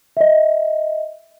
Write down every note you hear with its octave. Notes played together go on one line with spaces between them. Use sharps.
D#5 E5